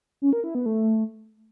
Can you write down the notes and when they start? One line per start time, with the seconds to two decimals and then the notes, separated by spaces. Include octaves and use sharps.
0.22 C#4
0.33 A#4
0.44 E4
0.55 B3
0.66 A3